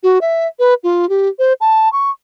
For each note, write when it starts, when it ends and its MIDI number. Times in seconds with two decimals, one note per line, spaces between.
0.03 0.19 66
0.21 0.47 76
0.59 0.74 71
0.84 1.08 65
1.09 1.28 67
1.39 1.53 72
1.61 1.91 81
1.93 2.10 85